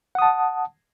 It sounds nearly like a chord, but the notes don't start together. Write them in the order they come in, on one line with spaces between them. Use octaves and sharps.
F#5 D#6 A5